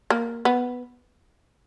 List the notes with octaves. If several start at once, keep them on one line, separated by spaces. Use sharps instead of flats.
A#3
B3